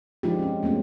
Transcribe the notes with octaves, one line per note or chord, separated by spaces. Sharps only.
F3 G#3 D4 D#4 F4 G4
C4 C#4
G#3 A3 B3 C#4